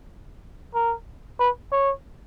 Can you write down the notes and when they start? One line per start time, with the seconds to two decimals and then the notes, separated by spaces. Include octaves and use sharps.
0.74 A#4
1.39 B4
1.72 C#5